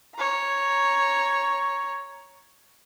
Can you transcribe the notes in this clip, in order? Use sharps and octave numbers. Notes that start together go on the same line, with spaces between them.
C#5 A#5